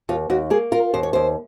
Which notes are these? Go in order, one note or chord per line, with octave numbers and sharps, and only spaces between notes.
D#2 F4
D#2 F#4
A#3 G#4
F4 A#4
D#2 C5
C#5
D#2 C5